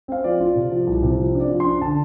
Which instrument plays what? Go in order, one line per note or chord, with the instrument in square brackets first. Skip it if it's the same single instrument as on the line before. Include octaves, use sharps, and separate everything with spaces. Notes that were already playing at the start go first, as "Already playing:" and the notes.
[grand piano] C4 F5
F3 D5
F4
C3
F3
C2
C3
F3
D4
D5
F3
C6
D4
D3 A5